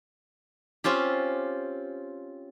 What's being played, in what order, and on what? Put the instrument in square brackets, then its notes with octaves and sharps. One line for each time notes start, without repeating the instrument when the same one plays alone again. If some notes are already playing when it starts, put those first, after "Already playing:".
[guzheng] C4 C#4 F4 G4